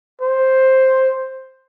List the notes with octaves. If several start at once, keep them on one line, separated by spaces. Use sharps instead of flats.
C5